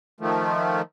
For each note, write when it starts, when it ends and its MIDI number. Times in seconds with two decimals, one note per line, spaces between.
0.20 0.82 51
0.20 0.82 53
0.20 0.82 57